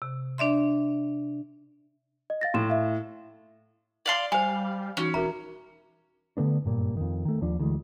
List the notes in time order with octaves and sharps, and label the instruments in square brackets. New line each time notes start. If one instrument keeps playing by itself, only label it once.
[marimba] C3
D4 D5 E5 C6
[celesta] D#5
F5 A6 A#6
[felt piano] A2 [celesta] C6 E7
[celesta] E5 F5
[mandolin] D5 F5 C6
[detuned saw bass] G3 [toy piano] C5 G#5 [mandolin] F5
[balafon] E3 D#4 F#4 [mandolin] C#4
[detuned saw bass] E1 [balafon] F#4 A#4 E5 [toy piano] A#5
[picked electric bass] D3 A3 B3 D4
F#1 G2 A#2
F2 D#3
D#3 A3
D#2 F3 D4
D2 E3 G#3